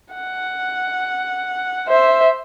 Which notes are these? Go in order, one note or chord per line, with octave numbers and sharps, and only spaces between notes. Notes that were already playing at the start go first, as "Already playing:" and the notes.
F#5
C5 E5